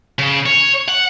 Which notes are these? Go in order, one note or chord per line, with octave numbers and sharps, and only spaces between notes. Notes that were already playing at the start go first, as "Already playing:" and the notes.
C#3
C#5
F#5